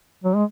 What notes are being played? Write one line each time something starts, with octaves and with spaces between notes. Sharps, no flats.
F#3
G#3